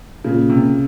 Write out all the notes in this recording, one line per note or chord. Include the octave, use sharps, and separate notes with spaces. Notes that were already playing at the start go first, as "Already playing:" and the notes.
A#2 C#3
C3